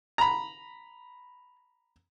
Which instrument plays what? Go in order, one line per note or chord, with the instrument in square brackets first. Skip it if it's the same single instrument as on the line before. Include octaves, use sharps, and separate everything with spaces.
[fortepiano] A#5 B5